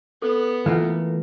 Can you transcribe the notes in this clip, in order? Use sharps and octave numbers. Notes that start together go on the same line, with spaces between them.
B3 A4
E3 A3 A#3 F4 B4 F#5